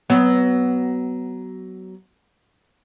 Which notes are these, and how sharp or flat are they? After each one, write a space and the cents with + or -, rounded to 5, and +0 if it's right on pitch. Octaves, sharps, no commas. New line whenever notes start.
F#3 +20 B3 +5